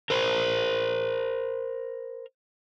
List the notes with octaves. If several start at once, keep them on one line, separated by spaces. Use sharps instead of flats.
A#4 C5